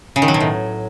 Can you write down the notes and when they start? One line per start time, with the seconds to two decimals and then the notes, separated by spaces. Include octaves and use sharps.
0.16 C#3
0.22 D#3
0.28 F#3
0.34 B2
0.40 A2